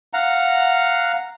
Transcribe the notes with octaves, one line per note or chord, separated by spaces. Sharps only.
F5 F#5 A#5